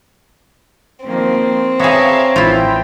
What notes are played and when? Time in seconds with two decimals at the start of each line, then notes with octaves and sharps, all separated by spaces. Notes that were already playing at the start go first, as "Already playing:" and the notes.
1.05 D#3 F3 A#3 C4
1.79 B3 G#4 C#5 E5 F5 A5 A#5
2.36 A1 E3 E4 F4 G5